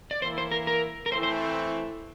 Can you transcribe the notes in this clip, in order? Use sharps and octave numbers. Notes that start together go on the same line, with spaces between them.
D5
E3 A#3 E4 C5
C5
A#4
A#4
A#4
E3 A3 C4 C5
C5